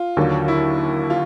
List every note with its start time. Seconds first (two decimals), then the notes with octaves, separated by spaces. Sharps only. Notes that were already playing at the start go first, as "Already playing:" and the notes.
Already playing: F4
0.17 D#2 D3 F#3
0.48 E4
1.10 F4